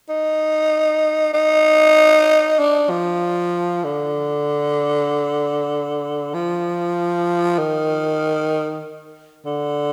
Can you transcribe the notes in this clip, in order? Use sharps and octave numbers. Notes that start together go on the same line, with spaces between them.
D#4
D#4
D4
F3
D3
F3
D#3
D3